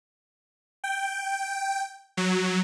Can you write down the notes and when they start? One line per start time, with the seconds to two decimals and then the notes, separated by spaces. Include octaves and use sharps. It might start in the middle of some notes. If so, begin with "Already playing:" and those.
0.84 G5
2.17 F#3